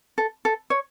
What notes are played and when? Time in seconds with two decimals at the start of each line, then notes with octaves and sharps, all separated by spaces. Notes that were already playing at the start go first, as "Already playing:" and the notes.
0.18 A4
0.45 A4
0.70 C#5